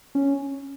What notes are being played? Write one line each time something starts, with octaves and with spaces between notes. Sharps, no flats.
C#4